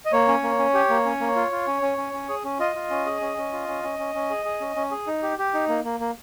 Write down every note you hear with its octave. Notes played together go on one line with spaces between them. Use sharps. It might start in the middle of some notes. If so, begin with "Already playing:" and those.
D#5
A#3 C#5
C#4
A#3
C#4
G4
A#3
C#4
A#3
F4
F4
C#4
C#4
C#4
C#4
G#4
C#4
F4 D#5
F4
C#4
G#4
C#4
C#4
F4
C#4
C#4
C#4
C#4
G#4
G#4
C#4
C#4
G#4
D#4
G4
G4
D#4
A#3
A#3
A#3